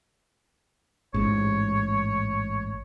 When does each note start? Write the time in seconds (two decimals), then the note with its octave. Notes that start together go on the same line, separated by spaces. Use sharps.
1.14 A1 G#2 C#5